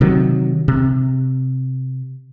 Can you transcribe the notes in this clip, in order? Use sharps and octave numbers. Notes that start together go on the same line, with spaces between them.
C3 D#3 F#3
C3